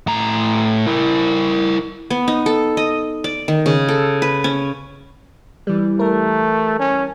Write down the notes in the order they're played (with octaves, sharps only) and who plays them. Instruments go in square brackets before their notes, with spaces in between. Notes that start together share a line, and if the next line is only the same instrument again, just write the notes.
[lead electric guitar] A2 A#5
E4 A#4
[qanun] B3
D#4
A4
D#5
D5
D#3
C#3
A4
B4
C#4
[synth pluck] E3 G3
[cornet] A3 [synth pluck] A#4
[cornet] C#4